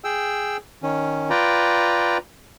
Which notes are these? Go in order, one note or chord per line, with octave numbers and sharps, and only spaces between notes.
G#4 G5 E6
D#3 C#4
F4 B4 D5 G5 A#5